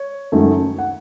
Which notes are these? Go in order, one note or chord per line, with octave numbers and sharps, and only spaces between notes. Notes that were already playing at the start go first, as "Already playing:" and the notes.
Already playing: C#5
F#2 D#3 F#3 A3
F#5